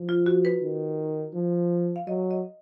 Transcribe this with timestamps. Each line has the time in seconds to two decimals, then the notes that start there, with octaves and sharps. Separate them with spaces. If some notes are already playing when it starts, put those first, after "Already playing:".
Already playing: F3
0.09 F4
0.26 F#4
0.45 B4
0.62 D#3
1.34 F3
1.96 F5
2.07 F#3 D#5
2.31 D#5